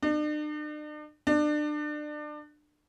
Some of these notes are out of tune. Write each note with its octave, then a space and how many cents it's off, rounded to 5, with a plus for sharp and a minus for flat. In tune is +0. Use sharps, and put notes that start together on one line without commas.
D4 +45
D4 +30